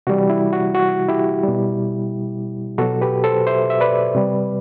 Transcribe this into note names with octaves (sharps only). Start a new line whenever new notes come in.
C3 E3 G3 F#4
E4
F#4
F#4
E4 G4
B2 G3
B2 F#3 F#4 A4
G4 B4
A4 C5
C5 E5
E5
B4 D5
C3 G3